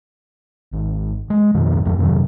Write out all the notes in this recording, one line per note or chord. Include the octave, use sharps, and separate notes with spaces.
G#1
G#3
F2 B2 D#3 F3
D1 F2 F3 A3
F2 C3 D#3 F#3